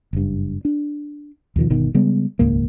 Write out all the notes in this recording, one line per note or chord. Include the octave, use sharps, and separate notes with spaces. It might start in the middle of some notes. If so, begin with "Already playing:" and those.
F#1 G2
D4
D#2 B2 D#3 F3
G1 B2 D#3
C#3 G3 G#3 B3
D#1 C#2 G#2 A#3